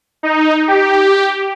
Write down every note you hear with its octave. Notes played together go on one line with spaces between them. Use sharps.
D#4
G4